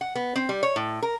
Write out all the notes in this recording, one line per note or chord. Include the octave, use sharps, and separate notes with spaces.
F#5
B3
C4
G3
C#5
A2
A#4